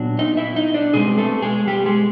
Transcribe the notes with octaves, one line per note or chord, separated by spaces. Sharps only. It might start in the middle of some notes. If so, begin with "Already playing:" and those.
Already playing: A#2 F#3 B3 D4
D#4 D#5
E4 E5
D#4 D#5
D4 D5
B2 G3 G#3 C4 G#4
A3 A4
G#3 G#4
G3 G4
G#3 G#4